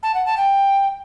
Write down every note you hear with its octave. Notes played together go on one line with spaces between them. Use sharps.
A5
F#5
A5
G5